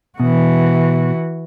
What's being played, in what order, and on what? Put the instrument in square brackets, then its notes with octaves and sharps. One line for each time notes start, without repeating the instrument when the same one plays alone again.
[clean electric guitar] B2 [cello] E3 F#4